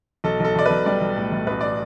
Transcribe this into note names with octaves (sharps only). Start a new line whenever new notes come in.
B1 A4
B1 A4
B1 D5
B1 B4
G3 D5
B1
A2
B1
A1 B4
D5